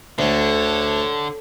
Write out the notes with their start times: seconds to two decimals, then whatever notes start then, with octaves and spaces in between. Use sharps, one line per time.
0.19 D2 D3 A4 C#5